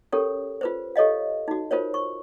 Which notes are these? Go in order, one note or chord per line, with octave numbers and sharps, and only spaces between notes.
C#4 G4 A4 A#4 C#5
F4 B4 C5
G4 A4 C#5 D#5 F5
D#4 F#4
F4 A#4 C5 C#5
C#6